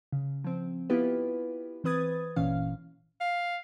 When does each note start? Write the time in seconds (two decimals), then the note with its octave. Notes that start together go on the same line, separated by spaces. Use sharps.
0.12 C#3
0.44 F3 C4
0.90 B3 E4 F4 G4 B4
1.84 E3 C4 B4 D#6 G#6 A6
2.36 G1 A#2 E3 C#4 F5
3.21 F5